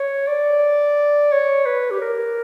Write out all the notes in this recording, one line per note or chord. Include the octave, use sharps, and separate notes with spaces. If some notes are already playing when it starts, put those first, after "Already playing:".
Already playing: C#5
D5
C#5
B4
G4
A#4